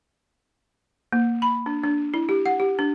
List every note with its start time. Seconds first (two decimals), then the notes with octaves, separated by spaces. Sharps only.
1.13 A#3
1.42 B5
1.66 D4
1.84 D4
2.14 E4
2.29 G4
2.46 F#5
2.60 G4
2.79 D4